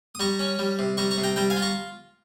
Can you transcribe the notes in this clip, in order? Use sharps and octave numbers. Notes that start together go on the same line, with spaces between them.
D#6
G3 A#5 C#6
C#4
G3
C3
G3 A#5 C#6
A#5 C#6
C3
G5 A#5
G3 G5 A#5
F5 G#5
F4
A#5 C#6